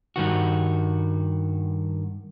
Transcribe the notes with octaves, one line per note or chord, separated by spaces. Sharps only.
G2 D#3 F#4